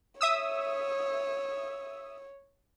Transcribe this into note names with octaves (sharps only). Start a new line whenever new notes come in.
C#5 E5 D#6 E6